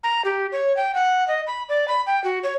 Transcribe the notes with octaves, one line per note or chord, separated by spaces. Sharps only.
A#5
G4
C#5
G5
F#5
D#5
B5
D5
B5
G5
F#4
C#5